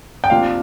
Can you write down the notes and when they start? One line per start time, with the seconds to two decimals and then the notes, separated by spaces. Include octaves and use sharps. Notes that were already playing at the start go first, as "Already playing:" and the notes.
0.24 G5
0.30 C3 F3 A#3 D4 F5